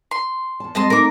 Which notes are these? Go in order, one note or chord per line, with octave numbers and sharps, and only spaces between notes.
C6
E2 A5
F2 G#3 C4 D#5 A5 C6
A3 C4 D#4 A#4 D6